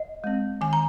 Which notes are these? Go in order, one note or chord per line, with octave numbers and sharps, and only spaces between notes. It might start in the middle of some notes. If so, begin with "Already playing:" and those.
Already playing: D#5
G#3 C4
D#3 G#5
A#5